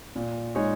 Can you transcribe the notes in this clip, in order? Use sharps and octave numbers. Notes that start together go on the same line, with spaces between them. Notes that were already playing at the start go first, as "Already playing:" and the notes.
A#2
G#3 D#4 G#4 C#5